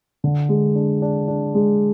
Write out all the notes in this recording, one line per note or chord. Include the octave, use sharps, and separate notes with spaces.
D3
G#3
D4
D4
D4
G#3